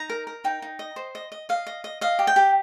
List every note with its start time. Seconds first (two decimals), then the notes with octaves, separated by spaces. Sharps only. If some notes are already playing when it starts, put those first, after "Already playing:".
Already playing: D#4 A#5
0.10 A#4
0.27 A#4
0.44 D#4 G5
0.62 D#4
0.79 D#5
0.96 C5
1.15 D#5
1.32 D#5
1.49 D#5 F5
1.67 D#5
1.84 D#5
2.01 D#5 F5
2.19 G4
2.27 G5
2.36 G4